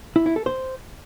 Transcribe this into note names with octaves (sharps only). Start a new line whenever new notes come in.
E4
E4
A4
C5